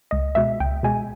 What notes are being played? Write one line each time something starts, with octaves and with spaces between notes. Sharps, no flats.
C#2 D#5
B2 G#3 E5
C#2 G5
B2 G#3 G#5